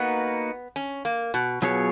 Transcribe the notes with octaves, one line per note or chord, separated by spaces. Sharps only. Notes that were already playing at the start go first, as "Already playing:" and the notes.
Already playing: A#3 B3 D#4 F#4 B4
C#4
A#3
B2
B2 F#3 B3 F4 G#4 C#5